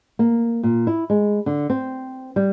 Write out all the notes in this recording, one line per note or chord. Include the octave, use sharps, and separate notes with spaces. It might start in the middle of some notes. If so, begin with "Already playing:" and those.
A#3
A#2
E4
G#3
D3
C4
G3